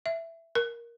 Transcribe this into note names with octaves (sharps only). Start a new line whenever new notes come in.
E5
A#4